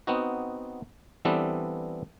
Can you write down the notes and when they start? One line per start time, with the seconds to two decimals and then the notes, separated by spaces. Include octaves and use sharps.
0.07 B3 C4 D#4 F#4
1.25 E3 G3 B3 C4 D4 A4